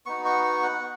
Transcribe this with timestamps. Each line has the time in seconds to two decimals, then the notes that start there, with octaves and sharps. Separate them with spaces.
0.06 B3 D#4 F#4 C#6
0.25 C#6
0.44 C#6
0.63 F#5